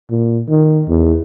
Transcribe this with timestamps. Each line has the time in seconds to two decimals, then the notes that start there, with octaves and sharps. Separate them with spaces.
0.10 A#2
0.49 D#3
0.88 E2